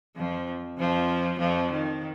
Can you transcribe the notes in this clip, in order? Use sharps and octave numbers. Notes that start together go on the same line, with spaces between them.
F2 F3
F2 F3
F2 F3
D#3